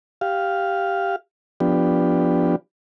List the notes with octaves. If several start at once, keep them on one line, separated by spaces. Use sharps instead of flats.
G4 F5
F3 B3 D4 G4